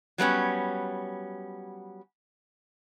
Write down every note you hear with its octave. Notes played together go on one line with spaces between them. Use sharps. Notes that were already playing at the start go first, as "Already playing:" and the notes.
F#3 G3 B3 C#4